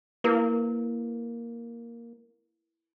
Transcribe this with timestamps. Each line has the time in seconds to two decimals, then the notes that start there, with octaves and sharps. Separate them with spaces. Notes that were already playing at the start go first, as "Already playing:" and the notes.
0.24 A#3 E4 A#4 B4